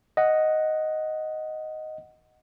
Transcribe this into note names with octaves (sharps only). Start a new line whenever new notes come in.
D#5 F#5